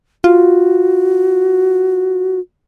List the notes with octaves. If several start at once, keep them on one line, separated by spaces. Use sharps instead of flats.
F4 F#4